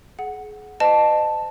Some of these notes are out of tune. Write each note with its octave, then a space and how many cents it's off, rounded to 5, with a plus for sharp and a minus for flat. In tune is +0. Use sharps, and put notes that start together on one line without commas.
G#4 +30 F#5 +0
C5 -35 D#5 -30 A5 +0